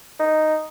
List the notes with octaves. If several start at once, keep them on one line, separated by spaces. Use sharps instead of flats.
D#4